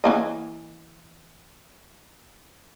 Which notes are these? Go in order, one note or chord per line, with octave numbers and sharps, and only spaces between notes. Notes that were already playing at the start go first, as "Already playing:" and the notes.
E3 A#3 D#5